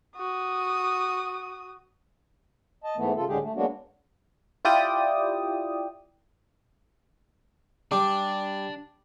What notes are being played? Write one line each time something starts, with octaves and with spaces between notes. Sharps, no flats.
F#4 D#6
D#5 A5
G#2 E3 A3 B3
C#3 F4 A4
D2 A2 D3 G#3 G4 G#4
A3
F#3 G#3 A#3 B3 D4 F#4
E4 F4 G4 D5 G5 D#6
G3 D4 D6